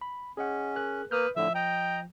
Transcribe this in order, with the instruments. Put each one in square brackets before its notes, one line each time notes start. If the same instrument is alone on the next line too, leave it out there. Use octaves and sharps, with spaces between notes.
[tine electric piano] B5
[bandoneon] C#4 [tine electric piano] G#4 D#5 F#5
[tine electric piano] G#4 A#4 F#6
[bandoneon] A#3 [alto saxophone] B4 [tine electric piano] D#6 F6 G6
[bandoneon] A2 D3 [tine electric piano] F3 [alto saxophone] E5
[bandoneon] D#5 A#5 [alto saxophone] G5